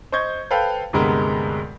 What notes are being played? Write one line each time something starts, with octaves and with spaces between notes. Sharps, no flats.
C5 D#5 C#6 G6 G#6
A4 B4 C5 F5 G5
D2 G2 C3 G#3 B3 A#4